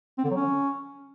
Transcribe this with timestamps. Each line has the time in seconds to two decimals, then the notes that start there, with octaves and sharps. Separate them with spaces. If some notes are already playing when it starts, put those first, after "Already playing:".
0.18 C4
0.24 D3
0.30 F#3
0.36 C#4